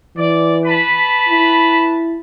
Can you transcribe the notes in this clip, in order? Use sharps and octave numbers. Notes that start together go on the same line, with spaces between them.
E3 D5
B4 A5 B5
E4